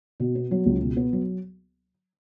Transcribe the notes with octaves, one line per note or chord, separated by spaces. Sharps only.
B2
B3
F#3
C#2
B2
B3
F#3